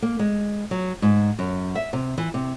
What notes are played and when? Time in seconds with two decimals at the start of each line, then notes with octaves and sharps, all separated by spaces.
0.02 A#3
0.19 G#3
0.71 F#3
1.02 G#2
1.39 F#2
1.75 E5
1.93 C3
2.18 E3
2.34 C3